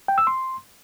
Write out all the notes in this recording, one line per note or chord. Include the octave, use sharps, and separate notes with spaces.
G5
E6
C6